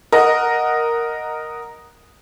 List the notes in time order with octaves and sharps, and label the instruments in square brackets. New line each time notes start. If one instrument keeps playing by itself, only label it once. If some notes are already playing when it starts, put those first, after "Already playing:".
[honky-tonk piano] A#4 D#5 F#5